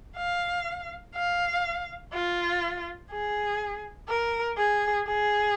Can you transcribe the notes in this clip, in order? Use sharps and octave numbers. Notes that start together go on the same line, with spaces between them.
F5
F5
F4
G#4
A#4
G#4
G#4